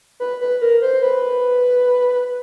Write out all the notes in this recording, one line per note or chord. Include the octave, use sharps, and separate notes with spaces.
B4
B4
A#4
C5
B4